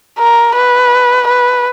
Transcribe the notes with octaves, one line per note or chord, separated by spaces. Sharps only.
A#4
B4
B4